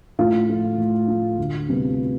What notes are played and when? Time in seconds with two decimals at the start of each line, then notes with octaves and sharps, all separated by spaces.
0.19 A2 F4
0.49 F3 A3
0.78 A2
1.08 F3
1.13 A3
1.38 D2
1.68 C3 G3 B3